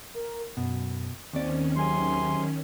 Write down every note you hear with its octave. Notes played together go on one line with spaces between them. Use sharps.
A#4
F#2 B2
D#2 D#3 C4 C#4 D5
C3 F#3 G#4 C6